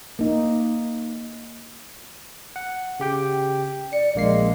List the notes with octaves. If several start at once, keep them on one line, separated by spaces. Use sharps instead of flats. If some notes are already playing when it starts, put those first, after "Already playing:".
A#3 D#4
F#5
C#3 G4 G5
D5 C#7
A#1 G#3 A#3 C7